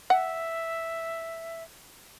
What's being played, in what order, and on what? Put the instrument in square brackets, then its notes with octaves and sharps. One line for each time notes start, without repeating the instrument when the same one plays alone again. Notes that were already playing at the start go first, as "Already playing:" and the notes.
[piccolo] E5 [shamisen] F#5